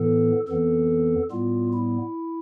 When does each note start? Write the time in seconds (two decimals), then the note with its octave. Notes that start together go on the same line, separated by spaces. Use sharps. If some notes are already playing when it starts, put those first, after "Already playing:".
Already playing: A2 E3 B3 A4
0.48 F2 E3 B3 A4
1.31 A2 G3 B3 F4
1.73 E4